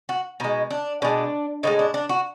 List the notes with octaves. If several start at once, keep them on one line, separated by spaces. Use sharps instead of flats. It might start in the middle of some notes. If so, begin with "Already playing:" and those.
F#4
B2 G#3 D#4
D4
B2 G#3 D4
A2 F3 G#3 D#4
D4
D4
F#4